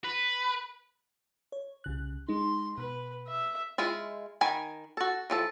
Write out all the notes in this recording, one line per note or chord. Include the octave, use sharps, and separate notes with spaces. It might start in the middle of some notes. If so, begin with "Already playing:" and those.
B4
C#5
C2 C#3 F#6
G#3 D#4 C6
B2 B4
E5
G#3 E4 F4
D#3 G#5 B5
F#4 A4
E3 F3 A4